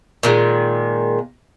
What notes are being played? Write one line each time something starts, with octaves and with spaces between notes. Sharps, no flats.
A#2 D#3 G#3